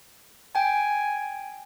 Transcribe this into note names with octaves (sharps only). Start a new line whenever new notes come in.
G5 G#5